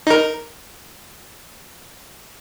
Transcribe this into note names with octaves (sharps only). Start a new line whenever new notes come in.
D#4 A#4